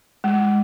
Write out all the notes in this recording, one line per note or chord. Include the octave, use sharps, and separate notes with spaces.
G#3